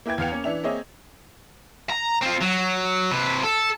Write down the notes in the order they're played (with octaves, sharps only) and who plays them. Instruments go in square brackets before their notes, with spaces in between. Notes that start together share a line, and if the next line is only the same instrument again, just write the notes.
[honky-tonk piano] A#3 E4 B4 G5 G#6
E2 B3 F5 G5 C#7 F7
A#3 C#4
E3 D4 E5 F7
A#3 C4 G#4 C#5 D#5 E5
[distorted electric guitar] A#5
C4 F4
F#3
C3 B4
A4